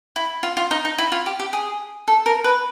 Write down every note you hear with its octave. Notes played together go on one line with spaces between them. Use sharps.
E4
F4
F4
D#4
D#4
E4
F4
G4
G4
G#4
A4
A#4
B4